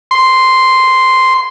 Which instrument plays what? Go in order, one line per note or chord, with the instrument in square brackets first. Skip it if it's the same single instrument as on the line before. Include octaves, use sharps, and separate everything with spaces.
[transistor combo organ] C6